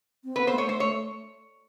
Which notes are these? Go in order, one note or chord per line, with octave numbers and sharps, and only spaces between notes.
C4
B3 B4
C5
A3 C#5
A3 C5
A3 C#5